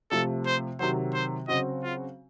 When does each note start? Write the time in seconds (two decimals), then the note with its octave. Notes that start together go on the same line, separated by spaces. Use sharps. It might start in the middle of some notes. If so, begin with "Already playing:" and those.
0.11 C3 F3 A3 A4
0.46 C5
0.79 C3 D#3 F#3 C5
1.14 C5
1.48 C#3 F#3 C4 F#4 D#5
1.83 F4